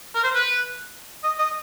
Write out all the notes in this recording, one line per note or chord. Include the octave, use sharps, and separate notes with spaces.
A#4
C5
B4
D#5
D#5